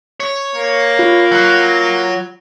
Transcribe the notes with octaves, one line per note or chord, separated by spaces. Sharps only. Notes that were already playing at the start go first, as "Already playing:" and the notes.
C#5
A#3
F4
F#3